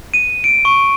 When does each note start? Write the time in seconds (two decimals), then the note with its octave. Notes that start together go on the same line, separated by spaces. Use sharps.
0.14 D#7
0.44 D7
0.65 C#6